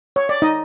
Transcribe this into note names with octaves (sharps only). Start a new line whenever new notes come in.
C#5
D5
D#4 D#5